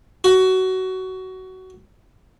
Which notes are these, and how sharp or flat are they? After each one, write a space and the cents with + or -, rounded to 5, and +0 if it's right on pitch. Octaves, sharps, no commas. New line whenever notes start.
F#4 +20